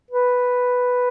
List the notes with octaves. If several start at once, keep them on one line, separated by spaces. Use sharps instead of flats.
B4